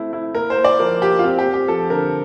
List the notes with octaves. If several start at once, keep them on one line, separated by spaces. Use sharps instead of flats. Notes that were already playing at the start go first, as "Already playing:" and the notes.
Already playing: A3 C4 E4
E4
A#3 A#4
C5
A#3
D5
F3 A#4
F4 G4
F4
C4 G4
G4
C4
G4
F3 A4
D3 A#4